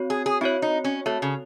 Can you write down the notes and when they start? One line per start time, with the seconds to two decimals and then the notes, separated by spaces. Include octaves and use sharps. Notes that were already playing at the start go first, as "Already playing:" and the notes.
Already playing: C4 F#4 C#5
0.10 G#4
0.26 G#4
0.41 C4 E4 F#4 C#5
0.62 D#4
0.84 C#4
1.06 A3 C4 F#4 C#5
1.22 C#3